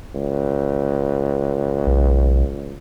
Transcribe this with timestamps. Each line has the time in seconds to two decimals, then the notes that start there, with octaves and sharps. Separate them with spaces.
0.15 C#2
1.87 B1